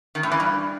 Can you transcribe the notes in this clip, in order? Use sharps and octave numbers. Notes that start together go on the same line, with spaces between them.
D#3
A2
E3
G2